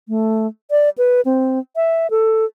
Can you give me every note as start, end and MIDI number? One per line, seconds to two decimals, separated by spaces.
0.08 0.47 57
0.71 0.90 74
0.98 1.21 71
1.25 1.59 60
1.76 2.10 76
2.11 2.45 69